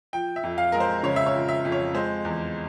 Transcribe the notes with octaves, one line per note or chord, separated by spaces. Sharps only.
F3 G5
E5
F2
F5
G#3 A#4
C5
C#3 C#5
E5
C#5
F3
E5
F2
C#5
G#3 C5
E2